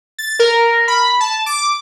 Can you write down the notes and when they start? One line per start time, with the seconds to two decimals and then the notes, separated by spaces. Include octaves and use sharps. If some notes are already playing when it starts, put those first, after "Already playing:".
0.18 A6
0.39 A#4
0.88 B5
1.20 A5
1.46 D6